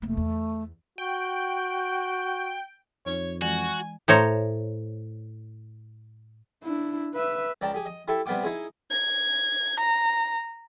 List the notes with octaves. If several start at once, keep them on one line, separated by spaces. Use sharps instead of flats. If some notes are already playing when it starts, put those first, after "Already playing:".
F1 A3 A#3
E2
F#4 G5
F2 D#4 C#5
E3 G#3 F#4 G#5
A2 C5 C#5 A#5
D4 E4
B4 E5
C#2 D5 G5 A5 A#5
G4 G#4
D#5
E4 G4 A4 E5 G5
C3 G3 B3 F5 G5 D6
D#4 E4 G#4
G#6
A#5